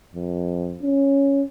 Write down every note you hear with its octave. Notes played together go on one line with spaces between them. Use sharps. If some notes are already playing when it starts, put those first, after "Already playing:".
F2
C#4